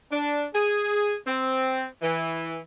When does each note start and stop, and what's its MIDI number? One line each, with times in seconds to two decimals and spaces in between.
0.11 0.46 62
0.54 1.15 68
1.27 1.87 60
2.02 2.59 52